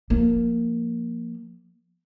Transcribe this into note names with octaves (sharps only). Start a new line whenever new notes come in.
F3 A#3